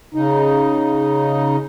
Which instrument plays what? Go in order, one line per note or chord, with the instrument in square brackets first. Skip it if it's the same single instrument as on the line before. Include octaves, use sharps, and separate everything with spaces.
[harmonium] C#3 D#4